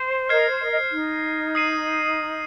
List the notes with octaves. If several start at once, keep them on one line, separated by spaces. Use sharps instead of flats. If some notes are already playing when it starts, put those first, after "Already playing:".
Already playing: C5
A#4 D#5 F6 G#6 C7
C5
A#4 D#5
D#5
C5
D#4
D#6 C7 D#7